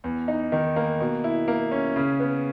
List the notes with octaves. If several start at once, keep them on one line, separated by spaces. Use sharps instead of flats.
E2
D#4
D#3
A#3
B2
E4
A#3
C#4
C#3
B3